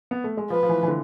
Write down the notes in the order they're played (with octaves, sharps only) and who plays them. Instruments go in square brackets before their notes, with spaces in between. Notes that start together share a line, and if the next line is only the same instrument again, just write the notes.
[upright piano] B3
A3
G#3
[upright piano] F3 [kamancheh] B4
[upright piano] F3
E3
E3
D3